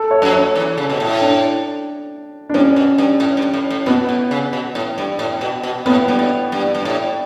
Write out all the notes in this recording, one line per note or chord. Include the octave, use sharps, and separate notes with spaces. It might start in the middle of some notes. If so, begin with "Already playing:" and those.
Already playing: A4
C#5
F#2 F#3
C#5
E2 E3
C#3
B2
A2
D4
D4
G2 C#4
B2
G2
A2
G2
A2
A2
B2 B3
A2
C#3
B2
A2
G2
A2
B2
B2
A2 B3
G2
A2
G2
G2
A2